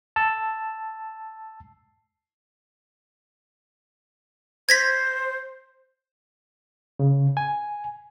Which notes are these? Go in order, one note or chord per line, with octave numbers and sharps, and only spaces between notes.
A5 E6
C5 G#6 A#6 B6
C#3
G#5